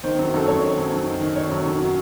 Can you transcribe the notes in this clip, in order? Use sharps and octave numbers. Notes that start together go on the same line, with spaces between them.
D#3 C5
F#2
F#2 A4
F#2 C#5
D#3
F#2
F#2
D#3
D#3
D#3 C#5
F#2
F#2
F#3